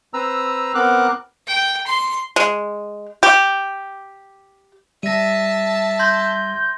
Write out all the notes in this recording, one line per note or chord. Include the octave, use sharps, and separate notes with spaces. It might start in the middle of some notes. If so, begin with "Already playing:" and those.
C4 B4 A#5 E6
B3 C4 A#4 D6 F#6
G5
C6
G#3
G4
G3 E5 A5 A#6 D#7
C6 G6 G#6 A#6